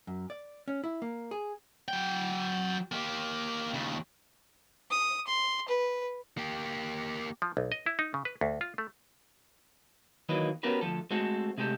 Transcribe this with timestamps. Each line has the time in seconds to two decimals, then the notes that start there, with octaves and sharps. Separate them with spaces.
0.07 F#2
0.30 D5
0.68 C#4
0.84 E4
1.02 A#3
1.31 G#4
1.88 F#3 G5
2.92 A#3 G4
3.74 D#2 C#3
4.91 D#6
5.27 C6
5.68 B4
6.37 A#3 G4
7.42 F3
7.57 B1
7.72 D#5
7.86 E4
7.99 D#4
8.14 C#3
8.25 B4
8.41 D2
8.61 F4
8.78 A3
10.29 D#3 E3 F#3 A#3 B4 D#5
10.63 B3 C#4 F#4 G4 A#4 B4
10.81 D2 C3 F3 A4
11.11 G#3 A3 C4 F#4 A4
11.58 C3 G#3 A3 G4 A4